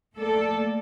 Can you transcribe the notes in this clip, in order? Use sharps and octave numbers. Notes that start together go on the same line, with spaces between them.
A3 A#3 A4 D5